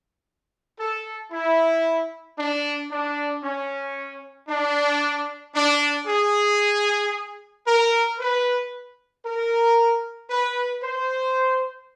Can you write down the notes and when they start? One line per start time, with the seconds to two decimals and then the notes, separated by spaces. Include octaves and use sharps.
0.79 A4
1.32 E4
2.38 D4
2.91 D4
3.44 C#4
4.49 D4
5.55 D4
6.08 G#4
7.67 A#4
8.19 B4
9.25 A#4
10.30 B4
10.83 C5